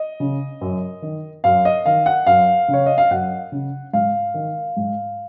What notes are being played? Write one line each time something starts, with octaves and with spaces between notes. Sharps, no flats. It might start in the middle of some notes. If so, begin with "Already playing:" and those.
Already playing: D#5
C#3
F#2
D#3
F#2 F5
D#5
D#3 F5
F#5
F#2 F5
C#3
C#5
D#5
F5
F#2 F#5
C#3
G#2 F5
D#3
G#2